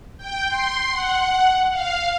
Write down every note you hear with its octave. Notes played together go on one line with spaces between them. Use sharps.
G5
C6
F#5
F5